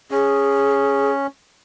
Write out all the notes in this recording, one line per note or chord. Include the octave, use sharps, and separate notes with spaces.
C#4 G#4